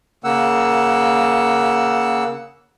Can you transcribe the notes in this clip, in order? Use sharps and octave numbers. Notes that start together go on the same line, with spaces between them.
C#3 A#3 F#5 E6